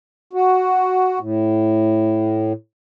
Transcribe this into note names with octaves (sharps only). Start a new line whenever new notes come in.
F#4
A2